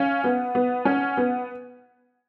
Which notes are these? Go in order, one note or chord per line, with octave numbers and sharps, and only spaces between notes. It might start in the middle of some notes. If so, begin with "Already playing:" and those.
Already playing: C#4 F5
B3 F#5
B3
C#4 F#5
B3